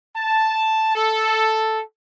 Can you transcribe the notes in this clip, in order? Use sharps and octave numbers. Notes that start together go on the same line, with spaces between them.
A5
A4